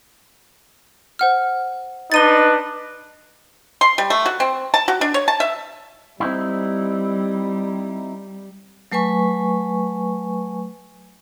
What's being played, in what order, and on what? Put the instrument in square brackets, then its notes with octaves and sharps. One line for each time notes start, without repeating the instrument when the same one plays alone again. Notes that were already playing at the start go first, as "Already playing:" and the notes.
[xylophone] C5 F#5 F6
[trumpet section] D4 D#4 B4 [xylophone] A6 D#7 G7
[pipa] C6
G3
A3
F#4
C4
A5
F#4
D4
C#5
A5
E5
[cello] G3 [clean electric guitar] C4 D#4 E4
[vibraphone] F#3 A3 B4 G#5 C#6